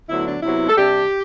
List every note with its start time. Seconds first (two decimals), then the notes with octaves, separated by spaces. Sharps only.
0.09 D2 D3 F#3 B3 E4
0.26 D4
0.42 C3 F#3 B3 E4
0.69 A4
0.77 C3 G3 D4 G4